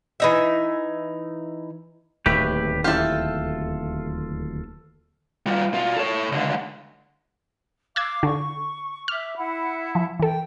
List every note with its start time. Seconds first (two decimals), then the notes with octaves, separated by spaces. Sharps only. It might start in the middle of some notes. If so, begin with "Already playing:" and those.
0.20 E3 D#4 E5
2.26 D1 D#2 A3 G4 B4
2.84 E4 F4 G4 A4
5.46 G3 F4
5.74 B2 F4
5.96 A4 C#5
6.32 C#2 D3
7.96 F5 D6 E6 F#6 G#6
8.23 D3 C#6
9.08 E5 D6 F6
9.37 E4 F#5
9.95 F3
10.19 E3 A4 G5